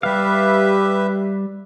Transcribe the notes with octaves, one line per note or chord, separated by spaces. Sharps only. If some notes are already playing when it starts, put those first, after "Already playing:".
G3 G4 B4 E5 F5